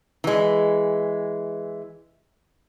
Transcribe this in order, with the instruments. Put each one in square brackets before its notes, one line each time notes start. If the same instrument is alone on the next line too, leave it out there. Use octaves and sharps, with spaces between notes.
[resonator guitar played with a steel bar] E3 G#3